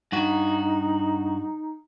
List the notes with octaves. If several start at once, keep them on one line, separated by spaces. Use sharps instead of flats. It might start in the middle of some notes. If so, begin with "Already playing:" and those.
G2 D#4 F#4